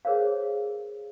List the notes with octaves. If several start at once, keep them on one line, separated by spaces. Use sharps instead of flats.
G#4 A#4 C5 C#5 F5